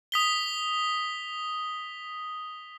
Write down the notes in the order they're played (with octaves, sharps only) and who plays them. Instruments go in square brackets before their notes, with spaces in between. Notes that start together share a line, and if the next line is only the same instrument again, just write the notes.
[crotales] D#6 B6 G7